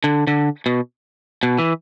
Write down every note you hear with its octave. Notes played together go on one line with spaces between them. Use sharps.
D3
D3
B2
B2
E3